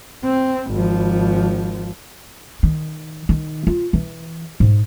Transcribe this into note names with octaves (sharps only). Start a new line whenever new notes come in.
C4
G#1 F3
D#3
D#3
F4
E3
G#2